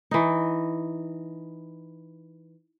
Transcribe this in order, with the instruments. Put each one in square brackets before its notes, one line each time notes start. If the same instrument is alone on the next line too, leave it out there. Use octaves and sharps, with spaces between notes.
[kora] E3 D#4